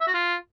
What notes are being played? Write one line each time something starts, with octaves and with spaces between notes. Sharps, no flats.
E5
F#4
F4